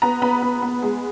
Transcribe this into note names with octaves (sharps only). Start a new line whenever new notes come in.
B3 A#5
B3 B5
B3
B3
G#3